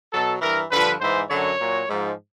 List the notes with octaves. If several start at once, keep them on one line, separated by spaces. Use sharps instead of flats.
B2 F#3 A4
G2 E3 A#4
G2 D3 F3 B4
G#2 E3 C5
F#2 D3 F#3 C#5
A#2 F#3
G#2 F3